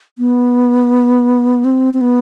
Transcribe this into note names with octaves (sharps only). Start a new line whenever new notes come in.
B3
C4
C4
B3